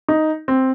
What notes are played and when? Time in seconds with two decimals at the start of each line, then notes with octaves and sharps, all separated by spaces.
0.08 D#4
0.48 C4